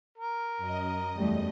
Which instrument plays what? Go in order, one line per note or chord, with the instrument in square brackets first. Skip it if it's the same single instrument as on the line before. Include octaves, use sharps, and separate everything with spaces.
[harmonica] A#4
[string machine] F#2 D#5
[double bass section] E2 G3 A3